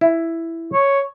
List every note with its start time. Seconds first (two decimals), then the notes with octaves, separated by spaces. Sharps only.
0.01 E4
0.73 C#5